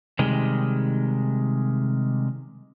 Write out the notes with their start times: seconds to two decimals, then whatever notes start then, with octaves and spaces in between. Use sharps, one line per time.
0.19 C3 D#3 G3 G#3